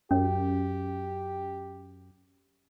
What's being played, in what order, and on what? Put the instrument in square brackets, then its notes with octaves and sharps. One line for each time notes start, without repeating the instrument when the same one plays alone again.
[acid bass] F#2 [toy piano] C#4 [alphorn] G4